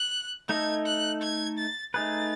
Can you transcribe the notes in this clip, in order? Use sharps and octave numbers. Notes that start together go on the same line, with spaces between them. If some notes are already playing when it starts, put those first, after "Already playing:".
Already playing: F#6
A3 D#4 A4 D#5 G#6
F#6
G#6
A6
A3 D#4 G#4 B4 A6